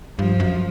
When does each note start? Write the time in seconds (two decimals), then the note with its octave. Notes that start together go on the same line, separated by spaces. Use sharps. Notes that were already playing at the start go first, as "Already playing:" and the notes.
0.19 G2 F3
0.40 F#2